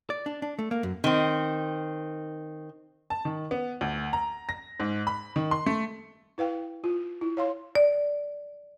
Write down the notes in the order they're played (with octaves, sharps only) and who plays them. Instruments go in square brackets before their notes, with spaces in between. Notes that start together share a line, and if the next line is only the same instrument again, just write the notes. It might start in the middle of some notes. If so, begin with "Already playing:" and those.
[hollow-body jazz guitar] D5
D4
D4
A3
A#3
F#2
[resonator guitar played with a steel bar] D#3 C4
[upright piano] A5
D#3
B3
D2
A#5
A#6
G#2
B5
D#3
C6
A3
[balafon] E4 B4 F5 G5
F4
E4
C#5 F5 C6
[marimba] D5